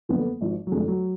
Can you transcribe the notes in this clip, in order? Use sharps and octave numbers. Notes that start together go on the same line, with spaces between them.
F#1 F2 D3 F3 B3
G#1 G#2 F3
F#3
F1 F2 D3 G#3
F#3